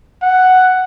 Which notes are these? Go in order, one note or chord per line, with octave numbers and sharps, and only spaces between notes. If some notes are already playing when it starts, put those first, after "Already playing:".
F#5